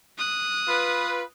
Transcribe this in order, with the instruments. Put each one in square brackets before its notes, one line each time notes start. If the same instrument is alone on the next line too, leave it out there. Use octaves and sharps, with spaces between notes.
[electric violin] D#6 F#6
[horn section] F4 B4